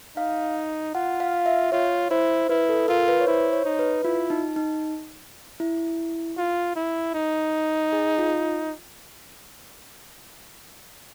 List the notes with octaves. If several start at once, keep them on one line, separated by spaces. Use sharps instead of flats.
D#4 F5
F4 F#5
F5
E5
F4 C#5
E4 C5
E4 B4
A4
F4 A#4
B4
C#5
E4 C5
C#5
D#4
B4
E4 F4
D#4
D#4
E4
F4
E4
D#4
G#4
F4